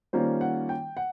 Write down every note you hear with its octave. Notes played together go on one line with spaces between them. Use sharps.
D#3 G3 A#3 C#4 F4 C5
F#5
G5
F#5